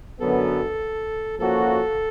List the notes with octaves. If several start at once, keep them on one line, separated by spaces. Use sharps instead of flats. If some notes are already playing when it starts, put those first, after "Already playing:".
F#2 D3 F#3 B3 A4
F3 A#3 C#4 F#4 A4